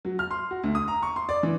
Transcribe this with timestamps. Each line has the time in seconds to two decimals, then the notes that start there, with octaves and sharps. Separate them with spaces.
0.05 F#3
0.19 F6
0.31 C6
0.51 F#4
0.64 D2
0.75 D#6
0.88 A#5
1.03 C#6
1.16 C6
1.29 D5
1.43 E3